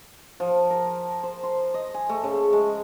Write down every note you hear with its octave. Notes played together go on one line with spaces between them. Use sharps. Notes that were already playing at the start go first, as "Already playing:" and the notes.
F3
A#4
C5
C6
D#5
G#5
A3
C#3
G#3